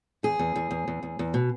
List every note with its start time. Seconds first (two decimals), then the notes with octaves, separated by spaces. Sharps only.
0.23 E2 G#4
0.39 E2
0.55 E2
0.71 E2
0.88 E2
1.03 E2
1.19 E2
1.34 B2